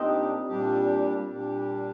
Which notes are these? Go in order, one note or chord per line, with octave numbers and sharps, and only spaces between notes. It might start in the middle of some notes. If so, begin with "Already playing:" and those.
Already playing: A#2 G3 C4 D4 D#4 G4
A#2 G3 D4 G4
A#2 G3 D4 G4